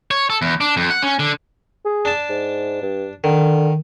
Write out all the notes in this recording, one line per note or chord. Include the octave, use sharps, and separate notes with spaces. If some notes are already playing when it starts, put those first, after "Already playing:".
C#5
A4
E2
D4
F2
F#5
C#4
D3
G#4
D4 A5
G#2
G2
D3 D#3